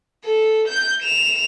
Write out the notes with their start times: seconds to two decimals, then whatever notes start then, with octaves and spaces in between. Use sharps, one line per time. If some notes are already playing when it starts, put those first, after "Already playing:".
0.24 A4
0.68 G6
1.02 E7 F7